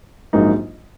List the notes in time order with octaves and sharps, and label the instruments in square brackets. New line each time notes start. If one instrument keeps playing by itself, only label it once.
[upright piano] A#1 G#2 F#3 A#3 D#4